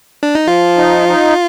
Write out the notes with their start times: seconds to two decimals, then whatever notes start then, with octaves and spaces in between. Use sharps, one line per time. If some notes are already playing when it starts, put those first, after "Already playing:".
0.23 D4
0.35 D#4
0.46 F3 F4
0.77 D#4
1.08 D#4